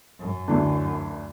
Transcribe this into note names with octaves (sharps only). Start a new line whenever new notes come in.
F#2
D2 E3 D4